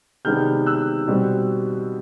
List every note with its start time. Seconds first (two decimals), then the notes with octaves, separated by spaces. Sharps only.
0.25 C3 D#3 G#3 B3 D4 F6 G6
0.66 E6 F#6
1.08 B2 G3 C4